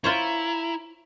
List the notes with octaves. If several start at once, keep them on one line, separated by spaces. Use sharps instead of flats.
E4 F4 C5 C#5 A#5